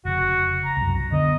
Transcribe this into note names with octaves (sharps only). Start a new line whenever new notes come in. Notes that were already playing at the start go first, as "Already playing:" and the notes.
F1 C#3 F#4
A#5
C2 F#2
D3 B3 D#5